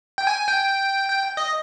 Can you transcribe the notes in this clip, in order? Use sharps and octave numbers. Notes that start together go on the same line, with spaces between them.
G5
G#5
G5
G5
D#5